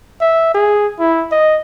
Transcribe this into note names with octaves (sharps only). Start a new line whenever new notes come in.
E5
G#4
E4
D#5